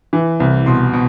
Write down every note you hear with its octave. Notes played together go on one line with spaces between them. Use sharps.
E3
C2
B2 C6
B2